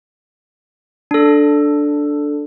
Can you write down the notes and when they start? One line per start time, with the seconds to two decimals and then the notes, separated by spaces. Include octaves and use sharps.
1.11 D4 A4